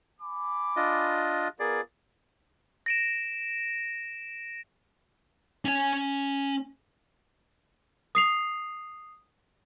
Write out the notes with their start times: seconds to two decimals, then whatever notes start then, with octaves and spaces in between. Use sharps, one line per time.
0.21 G#5 B5 D6
0.76 D4 F4 D#5
1.60 B3 F4 G#4 A#4 D5
2.86 A#6 D7 E7
5.65 C#4 G#5
8.15 D#6 C7 F7